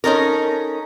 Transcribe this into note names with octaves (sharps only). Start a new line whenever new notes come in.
C#4 D#4 A4 A#4